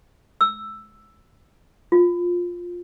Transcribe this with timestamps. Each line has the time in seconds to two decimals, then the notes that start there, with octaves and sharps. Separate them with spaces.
0.41 E6
1.92 F4